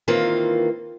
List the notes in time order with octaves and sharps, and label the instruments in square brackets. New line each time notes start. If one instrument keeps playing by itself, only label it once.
[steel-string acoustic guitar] D#3 E3 A#3 C4 F4